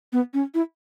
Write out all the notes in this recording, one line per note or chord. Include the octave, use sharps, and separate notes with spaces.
B3
C#4
E4